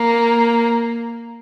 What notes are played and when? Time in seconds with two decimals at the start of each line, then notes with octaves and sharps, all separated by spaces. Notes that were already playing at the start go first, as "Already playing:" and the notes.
Already playing: A#3